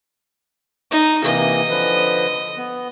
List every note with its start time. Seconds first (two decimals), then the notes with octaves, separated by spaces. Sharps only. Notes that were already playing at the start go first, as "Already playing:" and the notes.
0.91 D#4
1.24 C3 E3 A#3 D#5
1.70 D3 F3 B4
2.57 B3